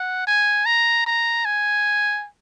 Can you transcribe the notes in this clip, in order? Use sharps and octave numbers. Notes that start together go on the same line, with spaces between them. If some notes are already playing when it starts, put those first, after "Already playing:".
Already playing: F#5
G#5
A#5
A#5
G#5